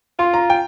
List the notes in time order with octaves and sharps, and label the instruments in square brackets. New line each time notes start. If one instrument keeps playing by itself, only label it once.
[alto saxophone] F4 [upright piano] C6
[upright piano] A#5
G5